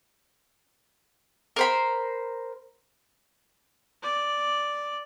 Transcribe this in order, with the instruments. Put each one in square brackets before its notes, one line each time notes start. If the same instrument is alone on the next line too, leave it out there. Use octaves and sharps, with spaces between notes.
[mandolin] A#4 C5 B5
[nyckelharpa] D5